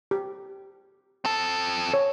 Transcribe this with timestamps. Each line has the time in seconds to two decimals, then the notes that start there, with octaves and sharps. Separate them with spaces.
0.11 G4
1.25 C4 A4
1.94 C#5